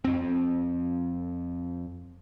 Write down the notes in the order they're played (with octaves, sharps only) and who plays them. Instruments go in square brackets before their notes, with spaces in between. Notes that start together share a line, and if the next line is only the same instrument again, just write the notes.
[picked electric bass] F2 C4